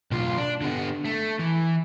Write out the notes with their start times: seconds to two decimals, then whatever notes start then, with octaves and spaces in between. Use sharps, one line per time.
0.11 B1 F4
0.38 D4
0.61 D3 B3
1.05 A3
1.39 E3